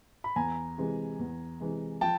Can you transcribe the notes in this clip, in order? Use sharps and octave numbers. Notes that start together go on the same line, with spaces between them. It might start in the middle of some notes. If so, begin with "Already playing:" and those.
B5
E2 G#5 A#5
C3 E3 G#3
E2
C3 E3 G#3
F3 G5 A5